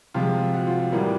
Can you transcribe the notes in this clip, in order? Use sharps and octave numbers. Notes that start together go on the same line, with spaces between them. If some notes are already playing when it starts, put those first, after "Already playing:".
C3 F3 G#3 F4
F#4
F4
F#4
A2 E3 G3 A#3